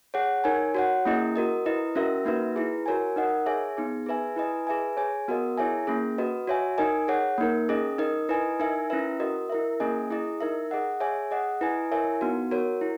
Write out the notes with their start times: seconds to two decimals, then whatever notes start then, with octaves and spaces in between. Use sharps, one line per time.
0.14 G#4 C#5 F#5
0.44 D#4 A#4 C#5 G#5
0.75 F#4 C#5 F#5
1.05 A#3 C#4 E4 G#4 D#5
1.36 F#4 A#4 D#5
1.66 E4 B4 D#5
1.95 C#4 F#4 A#4 E5
2.25 A#3 D#4 F#4 B4 E5
2.56 E4 G#4 B4
2.86 F#4 A#4 C#5 G#5
3.16 D#4 A#4 D#5 F#5
3.46 G#4 C#5 E5 G#5
3.77 B3 D#4 G#4
4.06 G#4 B4 E5 G#5
4.36 E4 B4 D#5 G#5
4.67 G#4 B4 E5 G#5
4.97 G#4 C#5 G#5
5.28 B3 F#4 A#4 D#5
5.58 E4 G#4 C#5 E5 G#5
5.87 A#3 C#4 G#4
6.18 F#4 B4 D#5
6.48 F#4 C#5 E5 G#5
6.78 D#4 A#4 D#5 G#5
7.08 G#4 C#5 F#5
7.38 A#3 D#4 A#4
7.69 C#4 G#4 D#5
7.98 D#4 A#4 D#5
8.29 E4 B4 D#5 G#5
8.60 D#4 A#4 E5 G#5
8.90 C#4 E4 B4 E5
9.20 F#4 A#4 D#5
9.50 E4 A#4 E5
9.80 A#3 C#4 G#4 D#5 G#5
10.11 E4 G#4 D#5
10.40 D#4 A#4 E5
10.71 G#4 D#5 F#5
11.00 G#4 C#5 E5 G#5
11.31 G#4 D#5 F#5
11.61 E4 B4 D#5 G#5
11.91 E4 A#4 C#5 E5 G#5
12.21 B3 D#4 F#4
12.51 F#4 A#4 C#5
12.81 E4